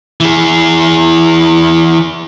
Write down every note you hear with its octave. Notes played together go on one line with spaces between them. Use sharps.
E3 G#4